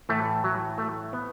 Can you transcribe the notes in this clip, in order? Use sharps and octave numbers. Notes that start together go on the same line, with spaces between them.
A2 E3 A3
F#3
A3
B3